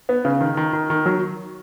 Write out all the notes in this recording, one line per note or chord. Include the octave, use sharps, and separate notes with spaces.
B3
C#3
D#3
D#3
D#3
D#3
F#3